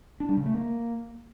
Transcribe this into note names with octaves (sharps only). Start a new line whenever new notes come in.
D4
G3
C#3
A3
A#3